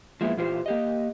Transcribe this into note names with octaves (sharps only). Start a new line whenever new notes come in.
F3 G#3 A#3 B3 E4
A#2 E3 F4 G4 C5
A#3 G4 D#5